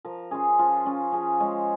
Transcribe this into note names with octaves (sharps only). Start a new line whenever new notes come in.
F3 A#4
C#4 F4 G#4
F3 F4
C#4 F4
F3 G#4
G#3 F4 C#5